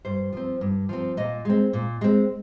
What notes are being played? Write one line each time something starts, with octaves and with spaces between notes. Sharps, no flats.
G2 C5
F3 C4
G2
F3 C4
A#2 D#5
G#3 C4
A#2
G#3 C4